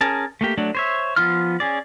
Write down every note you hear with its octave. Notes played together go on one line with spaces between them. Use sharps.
C#4 G#4 A#4 A5
A3 A#3 G4
F#3 A3 D4
C5 C#5 E5
F3 B3 F4 C6 F6
C#4 G#4 D5